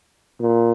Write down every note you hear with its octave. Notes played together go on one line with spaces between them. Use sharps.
A#2